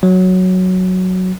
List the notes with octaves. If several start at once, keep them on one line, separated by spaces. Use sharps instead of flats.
F#3